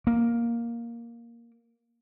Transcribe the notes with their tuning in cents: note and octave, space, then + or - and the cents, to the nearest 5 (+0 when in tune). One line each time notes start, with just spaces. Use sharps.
A#3 +5